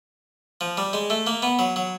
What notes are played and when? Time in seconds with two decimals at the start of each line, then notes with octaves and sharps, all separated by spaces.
0.61 F3
0.77 G3
0.93 G#3
1.10 A3
1.27 A#3
1.42 B3
1.59 F#3
1.76 F#3